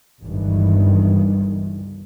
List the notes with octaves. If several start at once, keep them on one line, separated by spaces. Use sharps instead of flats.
G1 C#2 G2 D#3 E3